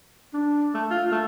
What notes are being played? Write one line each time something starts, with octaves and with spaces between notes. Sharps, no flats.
D4
A3
F4
A3